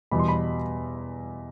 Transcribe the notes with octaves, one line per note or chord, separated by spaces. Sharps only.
E2 B2 G3 B5
C6
B5